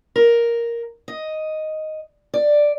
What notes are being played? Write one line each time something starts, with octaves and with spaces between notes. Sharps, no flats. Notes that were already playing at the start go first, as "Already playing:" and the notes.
A#4
D#5
D5